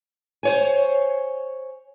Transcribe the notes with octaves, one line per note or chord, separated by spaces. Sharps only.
C5 C#5 G#5